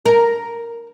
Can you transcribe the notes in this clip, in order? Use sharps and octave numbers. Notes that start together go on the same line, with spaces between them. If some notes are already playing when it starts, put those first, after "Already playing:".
A#4